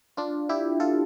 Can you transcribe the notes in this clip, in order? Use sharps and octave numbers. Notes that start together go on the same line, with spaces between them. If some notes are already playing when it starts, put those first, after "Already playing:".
D4 F4
E4 G4
F4 A4